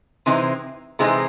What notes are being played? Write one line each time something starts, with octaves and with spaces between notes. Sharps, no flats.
C3 E3 G#3 C4 D#4
C3 E3 G#3 C4 D#4